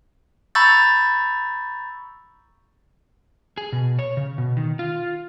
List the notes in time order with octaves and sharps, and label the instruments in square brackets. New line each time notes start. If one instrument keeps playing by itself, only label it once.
[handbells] A#5 B5 C#6 E6 G6 A6
[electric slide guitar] G#4
B2
C#5
C#3
B2
D#3
F4